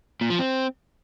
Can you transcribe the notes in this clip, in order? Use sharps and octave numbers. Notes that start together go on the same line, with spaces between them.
A#2
F3
C4